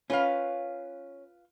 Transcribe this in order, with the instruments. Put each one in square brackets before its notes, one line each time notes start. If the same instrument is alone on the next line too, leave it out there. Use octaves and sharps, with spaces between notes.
[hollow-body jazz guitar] C#4 [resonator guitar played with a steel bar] F4 B4 F5